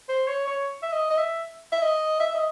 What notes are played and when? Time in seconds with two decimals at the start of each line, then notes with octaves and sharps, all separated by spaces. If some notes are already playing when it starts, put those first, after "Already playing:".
0.09 C5
0.28 C#5
0.47 C#5
0.83 E5
0.92 D#5
1.11 D#5
1.17 E5
1.72 E5
1.82 D#5
2.20 E5
2.35 D#5